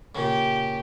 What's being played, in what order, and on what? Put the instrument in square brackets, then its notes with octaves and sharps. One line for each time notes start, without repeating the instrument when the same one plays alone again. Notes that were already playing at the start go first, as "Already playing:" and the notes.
[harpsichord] A#2 C#3 [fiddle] G4